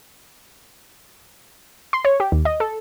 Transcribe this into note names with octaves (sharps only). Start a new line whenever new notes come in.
C6
C#5
G4
D#2
D#5
A4